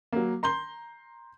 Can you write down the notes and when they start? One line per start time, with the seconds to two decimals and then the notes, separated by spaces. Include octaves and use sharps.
0.13 F#3 A#3
0.43 A#5 C6 G6 G7